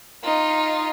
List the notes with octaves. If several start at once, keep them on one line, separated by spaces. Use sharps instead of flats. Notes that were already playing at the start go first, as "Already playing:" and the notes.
D#4 F4